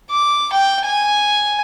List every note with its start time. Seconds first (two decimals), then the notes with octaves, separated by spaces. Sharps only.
0.10 D6
0.53 G5
0.84 G#5